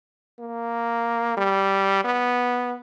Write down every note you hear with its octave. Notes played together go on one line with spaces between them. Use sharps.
A#3
G3
B3